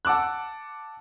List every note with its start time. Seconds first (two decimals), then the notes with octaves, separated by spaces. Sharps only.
0.05 F#5 A5 D6 E6 F#6